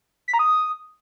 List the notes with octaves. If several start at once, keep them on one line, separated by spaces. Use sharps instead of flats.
B6
A#5
D#6